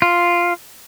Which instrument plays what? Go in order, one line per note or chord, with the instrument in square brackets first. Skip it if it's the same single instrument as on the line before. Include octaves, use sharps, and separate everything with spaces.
[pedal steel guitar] F4